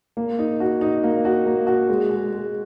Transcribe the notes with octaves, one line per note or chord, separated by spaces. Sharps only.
A#3
D#4
F#4
D#4
A#3
F#4
A#3
F#4
G#3
G#3
G#3